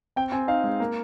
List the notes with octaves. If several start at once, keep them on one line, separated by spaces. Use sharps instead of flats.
C4 G5
C4 G#5
D#4 F5
G#3
A#3